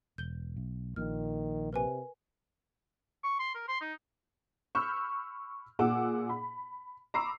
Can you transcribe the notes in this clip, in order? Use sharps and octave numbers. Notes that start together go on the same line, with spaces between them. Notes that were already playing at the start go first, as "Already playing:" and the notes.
E1 G6 G7
B1
A#1 A#2 D#3 F6
C3 A#4 B4 G#5
C#6
C6
A#4
C6
D#4
B5 C#6 E6 F6 G6
A#2 G#4 F#5 D6 E6
B5
A#5 B5 C#6 D6 E6 C7